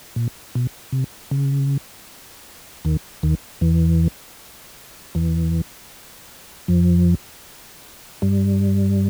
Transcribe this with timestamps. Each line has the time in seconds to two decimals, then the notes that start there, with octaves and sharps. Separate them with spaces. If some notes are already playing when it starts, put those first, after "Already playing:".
0.16 A#2
0.55 B2
0.92 C3
1.31 C#3
2.85 D#2 D#3
3.23 D#2 D#3
3.61 E2 E3
5.15 E2 E3
6.68 F2 F3
8.22 G2 G3